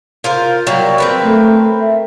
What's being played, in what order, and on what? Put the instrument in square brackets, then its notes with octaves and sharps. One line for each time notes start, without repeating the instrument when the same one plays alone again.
[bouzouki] F4 A#4 C5
F#3 G3 A#3
C4 A#4 B4
[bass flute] A3
E5